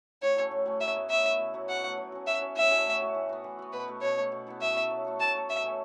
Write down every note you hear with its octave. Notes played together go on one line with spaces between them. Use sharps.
A2 C#5
F#3 A3 C#4
A2
F#3 A3 C#4
F#3 E5
B3 E4
F#3 E5
B3 E4
B2
F#3 A3 F#4
B2 F#5
F#3 A3 F#4
F#3
C#4 F#4
F#3 E5
C#4 F#4
A2 E5
A3 C#4 F#4
A2
A3 C#4 F#4
E3
B3 F#4
E3
B3 F#4
B2 B4
A3 F#4
B2 C#5
A3 F#4
B2
B3 E4 A4
B2 E5
B3 E4 A4
F#3
A3 F#4 A4
F#3 A5
A3 F#4 A4
B2 E5
A3 C#4